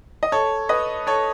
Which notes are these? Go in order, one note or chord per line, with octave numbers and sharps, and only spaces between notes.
D#5
A4 C#5
B4 D#5
A4 C#5